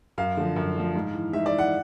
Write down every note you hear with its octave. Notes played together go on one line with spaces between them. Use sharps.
F#2 F5
D3 F3
F#2
D3 F3
G#2
E3
G#2 E5
D5
E3
F#5